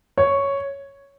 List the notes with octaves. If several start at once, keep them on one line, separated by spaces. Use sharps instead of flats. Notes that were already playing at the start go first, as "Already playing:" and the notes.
C#5